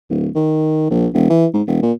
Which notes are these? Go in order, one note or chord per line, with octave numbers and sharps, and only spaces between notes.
D1
D#3
A#1
E1
E3
G#2
E1
A#2